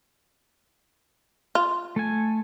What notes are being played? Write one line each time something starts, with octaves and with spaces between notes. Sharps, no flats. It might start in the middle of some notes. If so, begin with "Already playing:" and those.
F4
A3 A4 G#5